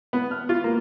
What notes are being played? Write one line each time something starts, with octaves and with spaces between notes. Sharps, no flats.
B3
F6
F4
A#3